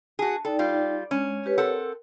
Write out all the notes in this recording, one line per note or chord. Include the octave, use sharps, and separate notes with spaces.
F#4 G#4 A5
D#4 A4 D5 G5
G3 F4
G#3 C#4
G4 B4 C#5
C4 A4 A#4 F#5